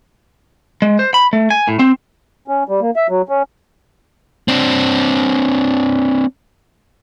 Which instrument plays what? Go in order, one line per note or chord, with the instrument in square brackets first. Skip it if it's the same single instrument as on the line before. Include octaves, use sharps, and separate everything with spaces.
[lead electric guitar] G#3
C5
B5
A3
G#5
A2
C4
[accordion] C#4
G3
A#3
E5
F#3
C#4
[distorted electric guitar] C4 D4